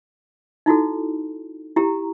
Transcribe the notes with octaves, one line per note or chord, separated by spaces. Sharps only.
D#4 E4 F#4 A4
E4 G4 A#5